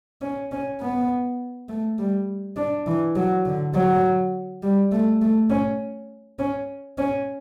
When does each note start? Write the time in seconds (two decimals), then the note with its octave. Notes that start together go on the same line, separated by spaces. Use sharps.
0.22 C#4
0.52 C#4
0.80 B3
1.69 A3
1.99 G3
2.56 D4
2.87 E3
3.16 F#3
3.46 D3
3.75 F#3
4.63 G3
4.92 A3
5.22 A3
5.50 C#4
6.39 C#4
6.98 C#4